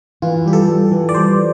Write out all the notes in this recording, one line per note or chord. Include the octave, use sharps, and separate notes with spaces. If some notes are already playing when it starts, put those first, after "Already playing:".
E3 F4
G3 G4
A4
G3
E3
D5
G3 C5